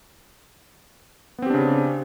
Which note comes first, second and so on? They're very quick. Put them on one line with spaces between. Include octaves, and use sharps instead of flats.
B3 C4 G4 D4 C#3